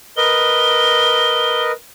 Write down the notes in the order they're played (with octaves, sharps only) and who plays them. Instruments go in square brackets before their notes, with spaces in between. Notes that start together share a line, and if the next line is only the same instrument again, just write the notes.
[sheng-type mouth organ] A#4 B4 D#5 [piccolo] G7